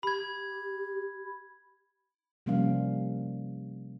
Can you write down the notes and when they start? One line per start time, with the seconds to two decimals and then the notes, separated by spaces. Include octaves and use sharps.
0.03 G4 B5 G#6
2.46 C3 F3 G3 A#3 C#4 F5